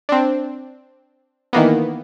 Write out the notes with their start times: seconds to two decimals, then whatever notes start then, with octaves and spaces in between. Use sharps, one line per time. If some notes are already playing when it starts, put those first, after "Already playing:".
0.09 C4 D4
1.53 D#3 E3 A#3 B3